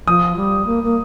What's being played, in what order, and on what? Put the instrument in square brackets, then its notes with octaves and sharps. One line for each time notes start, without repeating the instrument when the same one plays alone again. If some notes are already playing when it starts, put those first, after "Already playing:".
[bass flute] F3 [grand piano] D#6
[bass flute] G3
A#3
A#3